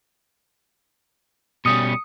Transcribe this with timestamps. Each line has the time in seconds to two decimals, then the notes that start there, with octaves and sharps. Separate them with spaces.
1.65 B2 G3 C#4 D#6 C#7